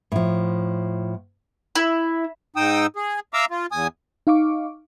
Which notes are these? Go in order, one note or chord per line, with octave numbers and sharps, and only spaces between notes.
A2 F3
E4
G#2 D#4 G5 D#6 E6
G#4
E5 F5 A#5 D6 E6
F4
E2 G#5 D#6
D#4 F5 C#6 D6